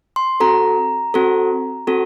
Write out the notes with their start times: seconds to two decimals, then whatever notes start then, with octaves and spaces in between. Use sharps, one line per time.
0.16 C6
0.40 C4 F#4 A4 A#5
1.14 C4 F#4 A4
1.87 C4 F#4 A4